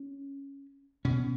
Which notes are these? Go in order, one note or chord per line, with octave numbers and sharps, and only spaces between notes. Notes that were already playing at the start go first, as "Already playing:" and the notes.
Already playing: C#4
B2 C#4